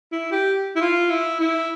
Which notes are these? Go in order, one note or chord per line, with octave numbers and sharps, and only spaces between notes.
E4
G4
E4
F4
E4
E4